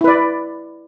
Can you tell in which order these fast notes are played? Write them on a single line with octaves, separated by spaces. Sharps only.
E4 B4 D5